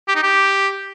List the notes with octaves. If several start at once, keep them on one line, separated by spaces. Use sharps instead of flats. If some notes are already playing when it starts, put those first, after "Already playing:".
G4
D#4
G4